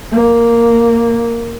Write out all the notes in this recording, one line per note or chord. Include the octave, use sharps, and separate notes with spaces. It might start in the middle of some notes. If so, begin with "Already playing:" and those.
A#3